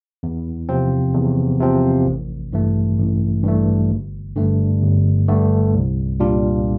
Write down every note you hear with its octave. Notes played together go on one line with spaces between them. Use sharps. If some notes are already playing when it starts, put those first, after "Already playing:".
E2
C3 F3 C4
E2
C3 F3 C4
A1
G2 E3 A3
A1
G2 E3 A3
G1
G2 D3 A3
G1
G2 D3 A3
C2
A#2 G3 D4 F4